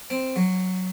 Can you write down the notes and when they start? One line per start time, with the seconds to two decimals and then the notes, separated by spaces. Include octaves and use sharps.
0.10 C4
0.36 F#3